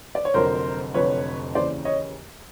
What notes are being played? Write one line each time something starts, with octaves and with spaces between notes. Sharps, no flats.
D5
C#5
F1 F2 D3 F#3 A#4 C5
F1 F2 D3 F#3 B4 C#5
D#2 C#3 E3 C5 D5
C#5 D#5